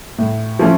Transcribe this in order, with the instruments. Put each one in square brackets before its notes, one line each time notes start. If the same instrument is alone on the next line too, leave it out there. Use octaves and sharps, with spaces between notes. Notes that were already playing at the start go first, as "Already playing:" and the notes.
[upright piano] A2
F3 A3 C#4